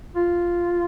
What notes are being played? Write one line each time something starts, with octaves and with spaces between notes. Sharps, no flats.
F4